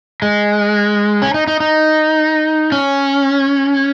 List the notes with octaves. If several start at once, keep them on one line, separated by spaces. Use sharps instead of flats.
G#3
C#4
D#4
D#4
D#4
C#4